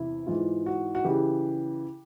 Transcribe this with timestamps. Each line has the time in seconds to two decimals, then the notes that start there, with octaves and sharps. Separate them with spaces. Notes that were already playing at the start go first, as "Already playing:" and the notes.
Already playing: E2 C3 E4
0.27 G#2 E3 F4
0.66 F#4
0.95 F#4
1.04 C#3 E3 G4